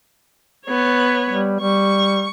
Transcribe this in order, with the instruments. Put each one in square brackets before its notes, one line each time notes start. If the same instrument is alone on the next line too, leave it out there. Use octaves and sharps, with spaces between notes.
[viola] B3 C#5
[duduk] G3
[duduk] G3 [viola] C#6